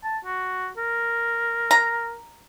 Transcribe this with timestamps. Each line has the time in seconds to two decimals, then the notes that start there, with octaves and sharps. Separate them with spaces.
0.04 A5
0.25 F#4
0.77 A#4
1.71 A#5